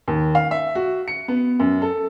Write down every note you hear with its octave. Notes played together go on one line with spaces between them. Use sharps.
D#2
F5
E5
F#4
C#7
B3
F#2
A4